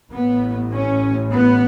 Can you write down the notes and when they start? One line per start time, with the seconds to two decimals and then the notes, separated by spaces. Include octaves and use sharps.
0.11 A1 A2 B3
0.71 C#4
1.33 B3